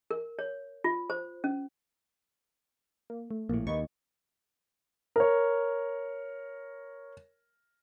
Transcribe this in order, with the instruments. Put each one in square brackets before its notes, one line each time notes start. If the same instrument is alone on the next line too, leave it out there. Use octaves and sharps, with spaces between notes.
[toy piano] A#4
C#5
F4
C5
C#4
[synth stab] A#3
A3
[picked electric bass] A#1 A2 [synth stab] A#3
[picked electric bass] D#2 [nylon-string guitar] A#3 D#4 B4 [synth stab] C#6
[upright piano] A#4 C#5